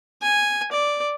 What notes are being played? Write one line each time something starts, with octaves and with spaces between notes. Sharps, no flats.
G#5
D5